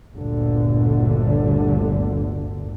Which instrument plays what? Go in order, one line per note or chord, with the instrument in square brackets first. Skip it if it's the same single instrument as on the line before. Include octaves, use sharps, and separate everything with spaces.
[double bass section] G1 D2 A#2 D3